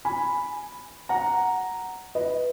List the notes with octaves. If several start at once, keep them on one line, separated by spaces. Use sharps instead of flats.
G#5 B5
F#5 A#5
B4 D#5